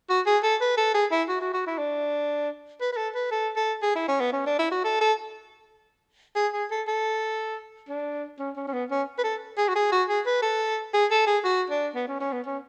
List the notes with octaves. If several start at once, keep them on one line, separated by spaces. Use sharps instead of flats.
F#4
G#4
A4
B4
A4
G#4
E4
F#4
F#4
F#4
E4
D4
B4
B4
A4
B4
A4
A4
G#4
E4
C#4
B3
C#4
D4
E4
F#4
A4
A4
G#4
G#4
A4
A4
D4
C#4
C#4
C#4
B3
C#4
B4
A4
G#4
F#4
G#4
F#4
G#4
B4
A4
G#4
A4
G#4
F#4
D4
B3
C#4
C#4
B3
C#4